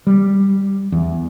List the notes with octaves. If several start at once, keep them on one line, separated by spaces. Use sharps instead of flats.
G3
E2